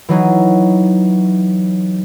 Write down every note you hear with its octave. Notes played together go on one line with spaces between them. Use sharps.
E3 F#3 D#4